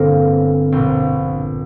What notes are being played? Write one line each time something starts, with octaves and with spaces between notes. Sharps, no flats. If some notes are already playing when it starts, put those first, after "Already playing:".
Already playing: G1 G2 D3 A#3 C4
A#1 A#2 C4